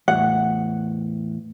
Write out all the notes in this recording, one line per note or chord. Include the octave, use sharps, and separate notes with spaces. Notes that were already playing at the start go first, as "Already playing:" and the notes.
E2 A2 F#5